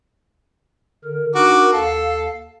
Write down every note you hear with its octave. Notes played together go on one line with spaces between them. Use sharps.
D3 A#4
D4 D#4 F#4 A#4 D6
D#2 A4 F5